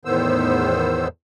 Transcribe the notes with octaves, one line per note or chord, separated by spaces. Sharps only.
E2 A2 D#3 B3 C5 E6